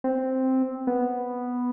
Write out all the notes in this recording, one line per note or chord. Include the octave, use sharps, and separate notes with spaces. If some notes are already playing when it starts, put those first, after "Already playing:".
C4
B3